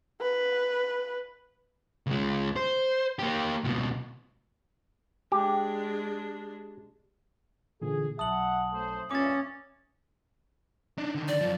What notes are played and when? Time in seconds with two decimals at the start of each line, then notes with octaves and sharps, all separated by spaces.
0.21 B4
2.07 C#2 G#3
2.56 C5
3.19 A#3 G4
3.64 C#2 B2
5.32 G#3 D4 G4
7.82 A#2 D3 E3 G#4
8.19 B1 E5 F#5 A5 D#6 F#7
8.73 F#2 A3 C5
9.11 G2 A#2 C#4 E5 D6 A6
10.98 D4 D#4
11.15 D3 D#3
11.28 D5
11.41 F#2 F3